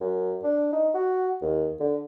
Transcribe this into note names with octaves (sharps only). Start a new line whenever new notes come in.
F#2
D4
D#4
F#4
D#2
D3